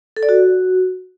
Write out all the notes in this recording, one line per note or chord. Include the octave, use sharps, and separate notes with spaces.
A4
D5
F#4